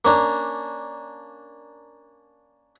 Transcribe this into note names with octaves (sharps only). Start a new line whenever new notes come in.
A#3 C#4 D4